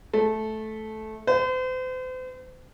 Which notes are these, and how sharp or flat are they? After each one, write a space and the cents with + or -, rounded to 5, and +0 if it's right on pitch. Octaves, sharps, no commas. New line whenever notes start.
A3 -15
C5 -40